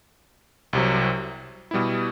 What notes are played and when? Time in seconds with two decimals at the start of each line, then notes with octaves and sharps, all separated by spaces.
0.73 C2 C3 F#3
1.71 B2 G3 B3 E4